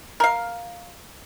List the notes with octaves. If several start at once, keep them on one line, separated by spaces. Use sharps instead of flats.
A#4 F5